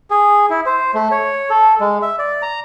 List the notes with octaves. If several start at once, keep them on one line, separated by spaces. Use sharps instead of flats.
G#4
E4
C5
A3
C#5
A4
G#3
E5
D5
A#5